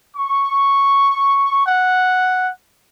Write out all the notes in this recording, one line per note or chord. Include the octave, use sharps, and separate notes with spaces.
C#6
F#5